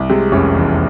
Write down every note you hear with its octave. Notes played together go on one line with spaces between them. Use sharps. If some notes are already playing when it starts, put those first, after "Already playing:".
Already playing: C2
C3 G#3
F1 C#4
E2